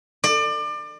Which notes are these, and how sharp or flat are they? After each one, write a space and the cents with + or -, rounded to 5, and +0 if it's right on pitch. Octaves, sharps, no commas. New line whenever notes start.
D5 +30